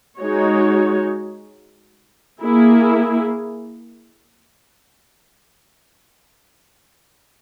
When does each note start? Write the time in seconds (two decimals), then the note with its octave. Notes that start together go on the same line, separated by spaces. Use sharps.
0.20 G#3 D#4 F#4 C#5
2.42 A#3 E4 G#4